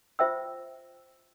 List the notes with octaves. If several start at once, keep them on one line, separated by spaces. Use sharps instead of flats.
F4 C5 E5 G5 E6